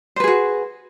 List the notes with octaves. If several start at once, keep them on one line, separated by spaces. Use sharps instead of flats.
F#4 G#4 B4 C5